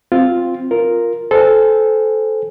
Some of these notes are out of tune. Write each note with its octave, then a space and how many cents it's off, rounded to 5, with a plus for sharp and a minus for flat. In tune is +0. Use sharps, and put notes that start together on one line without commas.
C4 +0 F4 +0
F4 +0 A#4 +0
A4 -15 C5 -20 G#5 -20